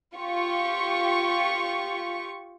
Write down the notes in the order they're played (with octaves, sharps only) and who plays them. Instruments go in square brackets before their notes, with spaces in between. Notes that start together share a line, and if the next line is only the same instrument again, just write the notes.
[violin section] F4 G4 C#6